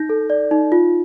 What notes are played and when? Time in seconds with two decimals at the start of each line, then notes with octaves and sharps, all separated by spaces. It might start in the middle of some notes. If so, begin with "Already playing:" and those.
Already playing: D#4 G6 A#6
0.09 A4
0.30 D5
0.51 D#4
0.72 F4